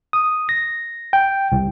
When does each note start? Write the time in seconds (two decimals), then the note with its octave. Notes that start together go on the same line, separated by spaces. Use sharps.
0.13 D#6
0.49 A#6
1.13 G5
1.52 C2